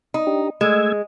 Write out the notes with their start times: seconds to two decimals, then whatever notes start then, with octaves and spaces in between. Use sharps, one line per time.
0.14 D#4
0.27 D4 G4
0.61 G#3 A3 E6 G#6